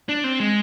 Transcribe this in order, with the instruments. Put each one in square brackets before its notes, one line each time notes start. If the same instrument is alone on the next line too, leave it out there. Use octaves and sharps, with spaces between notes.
[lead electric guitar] D4
C4
G#3